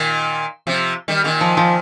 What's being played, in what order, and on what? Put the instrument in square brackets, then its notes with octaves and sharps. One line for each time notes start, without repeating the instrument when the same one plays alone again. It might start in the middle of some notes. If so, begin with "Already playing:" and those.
Already playing: [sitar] A#2 D#3
C3 F3
D#3 G3
A#2 D#3
[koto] F3
F3